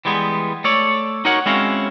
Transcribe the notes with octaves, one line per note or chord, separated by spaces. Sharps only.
E3 G3 G#3 B3
A3 A4 C#5 D5
D#4 F#4 A#4 C#5 F#5
G#3 C4 C#4 E4 F#4 F5